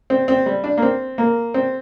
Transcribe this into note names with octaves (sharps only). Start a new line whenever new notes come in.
C4
C4
G3
D4
A#3
C4
A#3
C4